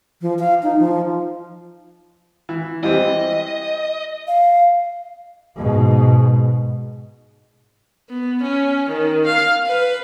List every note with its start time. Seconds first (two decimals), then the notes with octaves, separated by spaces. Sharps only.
0.22 F3
0.39 F5
0.63 D#4
0.79 F3
2.49 E3
2.83 E3 G3 C4 D#5
4.28 F5
5.55 G#2 B2
8.10 B3
8.42 C#4
8.89 D#3
9.26 F5
9.66 B4